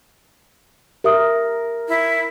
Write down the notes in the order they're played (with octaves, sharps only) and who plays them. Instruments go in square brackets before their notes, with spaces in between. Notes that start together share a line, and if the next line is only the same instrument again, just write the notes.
[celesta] G4 E5 D#6 [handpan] A#4
[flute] E4